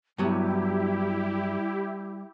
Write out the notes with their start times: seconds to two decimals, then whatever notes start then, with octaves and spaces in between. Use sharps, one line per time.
0.18 G2 F#3 G3 B3 E4 G4